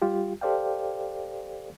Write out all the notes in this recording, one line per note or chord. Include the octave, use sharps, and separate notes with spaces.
G3 F4 G4
G4 A4 C5 D5 F5 G5